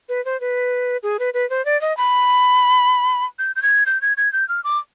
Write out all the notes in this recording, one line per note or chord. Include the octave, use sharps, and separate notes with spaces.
B4
C5
B4
G#4
B4
B4
C5
D5
D#5
B5
G6
G6
G#6
G6
G#6
G#6
G6
F6
D6